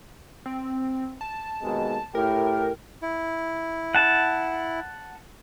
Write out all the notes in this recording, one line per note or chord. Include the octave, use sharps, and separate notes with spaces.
C4
A5
D#2 B2 G#3
A2 G4 A#4
E4
F#5 A5